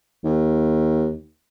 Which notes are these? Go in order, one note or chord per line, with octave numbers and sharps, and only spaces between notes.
D#2